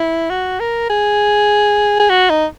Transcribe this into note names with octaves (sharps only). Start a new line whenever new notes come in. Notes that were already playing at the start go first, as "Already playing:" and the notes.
Already playing: E4
F#4
A#4
G#4
G#4
F#4
D#4